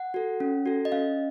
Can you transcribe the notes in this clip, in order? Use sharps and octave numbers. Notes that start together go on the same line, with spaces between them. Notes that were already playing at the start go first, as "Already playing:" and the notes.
Already playing: F#5
F#4 A4
C#4
F#4 A4
D#5
C#4 F5